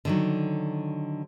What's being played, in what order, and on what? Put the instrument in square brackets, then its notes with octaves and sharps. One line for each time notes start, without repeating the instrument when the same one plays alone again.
[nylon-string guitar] D3 D#3 F#3